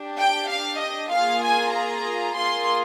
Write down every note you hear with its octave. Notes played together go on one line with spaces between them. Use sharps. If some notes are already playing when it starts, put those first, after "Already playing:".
Already playing: D4 G4
G5
F5
D#5
A#3 F4 G#4 F5
G#5
A#5
A#3 F4 G#4 C6